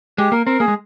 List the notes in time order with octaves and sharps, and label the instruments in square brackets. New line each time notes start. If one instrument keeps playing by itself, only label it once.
[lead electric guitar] G#3 [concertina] G4
[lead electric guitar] A#3 [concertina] A#4
[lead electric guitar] C4 [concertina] A#4
[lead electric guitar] A#3 [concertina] G#4
[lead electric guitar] G#3